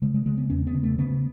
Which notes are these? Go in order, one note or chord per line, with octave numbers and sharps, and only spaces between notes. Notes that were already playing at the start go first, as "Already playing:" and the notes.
C#3 G#3
G#3
C#3 G#3
B3
E2 C#4
B3
C#3
A3
C#3 B3